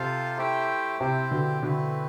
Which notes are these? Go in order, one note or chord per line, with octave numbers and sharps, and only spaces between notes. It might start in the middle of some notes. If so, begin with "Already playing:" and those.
Already playing: C3 F4 A4 C5 F5
A3 E4 G4 C5 G5
C3 C4 E4 G4 C5 G5
B2 D3
B2 D3 A3 C4 E4 B4